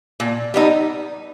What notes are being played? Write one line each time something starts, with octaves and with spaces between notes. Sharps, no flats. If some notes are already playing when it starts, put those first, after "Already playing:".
A#2
G3 B3 D#4